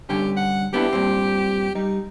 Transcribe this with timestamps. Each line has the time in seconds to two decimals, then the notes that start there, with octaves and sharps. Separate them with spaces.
0.09 G2 D3 C#4 G4
0.37 F#5
0.74 B3 D4 E4 G4
0.93 G2 A#2 C4
1.75 G3 D#4